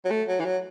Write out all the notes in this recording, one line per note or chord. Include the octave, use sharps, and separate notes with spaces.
F#3
A3
F#3
E3
F#3